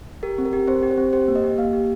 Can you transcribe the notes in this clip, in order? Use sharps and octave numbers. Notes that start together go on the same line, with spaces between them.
G4 A#4
C4
A#4
G4
C4 C5
G4
C5
C4
G4 C5
A#3
D#5
G4
A#3 F5
G4